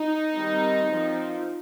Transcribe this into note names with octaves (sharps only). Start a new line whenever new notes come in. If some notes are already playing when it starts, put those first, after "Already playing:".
Already playing: D#4
D#3 G3 C4
F3 C4